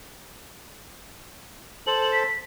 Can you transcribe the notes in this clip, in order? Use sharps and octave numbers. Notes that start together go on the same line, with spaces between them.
A4 C5 A5 F#7
B6